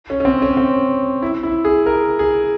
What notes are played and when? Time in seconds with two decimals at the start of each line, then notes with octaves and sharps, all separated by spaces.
0.10 C#4
0.20 C#4
0.25 C4
0.42 C#4
0.57 C4
1.22 E4
1.43 E4
1.65 G#4
1.86 A#4
2.19 G#4